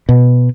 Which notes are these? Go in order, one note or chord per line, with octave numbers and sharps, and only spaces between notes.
B2